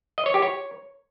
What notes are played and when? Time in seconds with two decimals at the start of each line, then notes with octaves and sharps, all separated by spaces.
0.18 D#5
0.26 C#5
0.34 G4
0.42 C#5